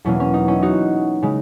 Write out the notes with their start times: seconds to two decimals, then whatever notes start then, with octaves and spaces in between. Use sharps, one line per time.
0.05 E2 B2 F#3 A#3 C#4 E4
0.20 C#4
0.34 D#4
0.48 C#4 E4
0.62 D#4 F#4
1.23 C#3 G#3